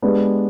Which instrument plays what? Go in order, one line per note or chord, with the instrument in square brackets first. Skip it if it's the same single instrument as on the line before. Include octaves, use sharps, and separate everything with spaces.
[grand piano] G#3 B3 D4 G4